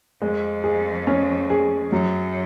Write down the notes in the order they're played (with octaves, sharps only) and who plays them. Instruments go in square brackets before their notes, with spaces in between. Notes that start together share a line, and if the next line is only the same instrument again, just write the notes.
[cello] F2 [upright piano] G#3
[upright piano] G#4
C#4
G#4
[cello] F#2 [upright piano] F#3